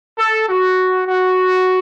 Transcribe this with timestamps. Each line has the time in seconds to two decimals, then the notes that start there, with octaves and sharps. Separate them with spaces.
0.17 A4
0.48 F#4
1.07 F#4